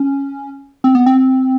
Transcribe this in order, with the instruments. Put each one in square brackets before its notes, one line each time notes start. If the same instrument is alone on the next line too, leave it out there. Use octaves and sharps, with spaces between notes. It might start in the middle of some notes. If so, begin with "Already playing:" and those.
Already playing: [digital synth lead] C#4
C4
B3
C4